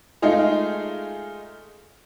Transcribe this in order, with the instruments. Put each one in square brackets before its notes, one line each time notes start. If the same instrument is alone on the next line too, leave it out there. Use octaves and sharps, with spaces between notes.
[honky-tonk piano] G#3 A3 D#4 F4 G#4